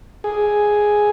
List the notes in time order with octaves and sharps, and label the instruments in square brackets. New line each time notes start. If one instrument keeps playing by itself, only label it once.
[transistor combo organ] G#4